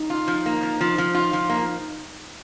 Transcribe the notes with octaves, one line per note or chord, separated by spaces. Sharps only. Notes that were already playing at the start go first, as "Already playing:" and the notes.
Already playing: D#4
F4
F3
A#3
F3
F3
F3
D#4 F4
F3
A#3